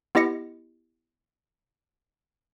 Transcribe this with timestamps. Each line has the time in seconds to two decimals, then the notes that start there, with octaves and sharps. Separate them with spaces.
0.15 B3 E4 G4 D#5 A#6 C#7